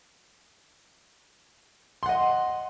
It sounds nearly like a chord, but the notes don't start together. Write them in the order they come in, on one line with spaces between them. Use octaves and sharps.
C6 F#5 D#5